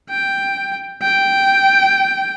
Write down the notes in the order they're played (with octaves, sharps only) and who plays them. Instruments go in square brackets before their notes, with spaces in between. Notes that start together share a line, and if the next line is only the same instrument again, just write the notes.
[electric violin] G5
G5